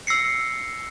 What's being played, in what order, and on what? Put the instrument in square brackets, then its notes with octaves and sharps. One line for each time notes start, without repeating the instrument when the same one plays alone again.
[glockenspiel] E6 A#6 C7 C#7